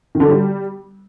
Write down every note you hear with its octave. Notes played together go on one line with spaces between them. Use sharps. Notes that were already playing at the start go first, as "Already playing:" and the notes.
D#3
D3
F#3
G3